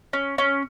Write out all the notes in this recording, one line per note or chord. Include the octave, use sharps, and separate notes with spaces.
C#4
C#4